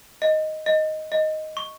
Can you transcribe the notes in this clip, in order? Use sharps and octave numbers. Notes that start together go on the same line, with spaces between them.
D#5
D#5
D#5
C#6